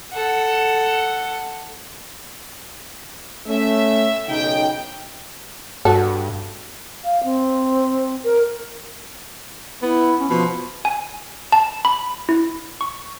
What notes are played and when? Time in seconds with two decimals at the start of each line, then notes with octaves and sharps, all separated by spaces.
0.13 A4 F#5
3.46 A3 C#4 E5
4.29 B1 C#3 D#4 G5
5.85 G2 F#4 A4
7.04 F5
7.24 C4
8.25 A#4
9.82 B3 E4
10.19 C#4
10.30 B2 F3
10.85 G#5
11.52 A5
11.85 B5
12.29 E4
12.81 C#6